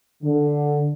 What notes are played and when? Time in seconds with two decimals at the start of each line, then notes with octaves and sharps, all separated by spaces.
0.23 D3